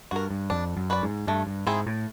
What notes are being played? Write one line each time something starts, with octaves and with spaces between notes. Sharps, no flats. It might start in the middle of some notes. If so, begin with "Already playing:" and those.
G2 F#4 A#4
G2
F2 D4
F#2
F#4 B4 D5
G#2
G2 A3
G2
G#2 C4 E4 G#4
A2